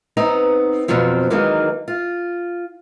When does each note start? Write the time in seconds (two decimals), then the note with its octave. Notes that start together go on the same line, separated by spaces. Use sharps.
0.17 B3 C4 D#4 A#5
0.88 F2 B2 F3 F#3 C4
1.30 D#3 E3 F#3 G#3 A#3 D#4
1.88 F4